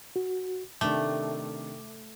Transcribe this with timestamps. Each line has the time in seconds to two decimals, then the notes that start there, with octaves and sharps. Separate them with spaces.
0.16 F#4
0.81 C3 D#3 A3 D4 D6